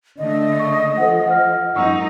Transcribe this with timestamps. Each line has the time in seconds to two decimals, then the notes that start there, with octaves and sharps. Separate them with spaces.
0.19 D3 A3 D#5
0.59 C#6
0.97 F3 A4 C5 F#5
1.26 F#5 F6
1.75 F#2 G#3 D#4 F#5 C#6 E6